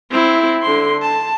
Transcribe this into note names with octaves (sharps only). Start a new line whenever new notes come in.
C4 E4
D3 C6
A5